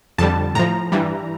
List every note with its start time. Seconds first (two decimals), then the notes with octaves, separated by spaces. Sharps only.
0.18 F2 D3 G3 A5
0.55 A2 F3 A#5
0.92 G2 E3 G3